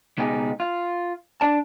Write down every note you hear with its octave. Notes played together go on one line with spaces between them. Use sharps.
C#2 B2 D#4 G4 G#4
F4
D4 D5 A5